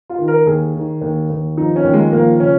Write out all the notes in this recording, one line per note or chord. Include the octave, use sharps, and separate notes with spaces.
F4
D#3
A#4
D#2 G#4
D#3
D#2
D#2
F3 D#4
C#4
D#2
G#3
F3 A#3
C#3 C#4